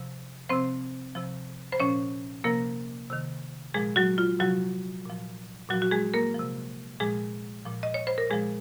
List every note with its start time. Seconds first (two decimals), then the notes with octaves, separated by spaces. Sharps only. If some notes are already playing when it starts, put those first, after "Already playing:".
Already playing: C3 F3
0.50 C3 F3 C4 C5
1.15 C3 F3
1.72 C5
1.80 A#2 F3 C#4 C#5
2.44 C3 F3 A#3 A#4
3.10 C3 D#3
3.74 A#2 F3 G#3 G#4
3.96 F#3 F#4
4.18 F4
4.40 C3 F3 F#3 F#4
5.06 A#2 F3
5.69 A#2 F#3 F#4
5.74 F3
5.82 F#4
5.91 G#3 G#4
6.14 A#3 A#4
6.34 C3 F3
7.00 A#2 F3 G#3 G#4
7.65 A#2 F3
7.83 D#5
7.94 C#5
8.07 C5
8.18 A#4
8.30 A#2 F3 G#3 G#4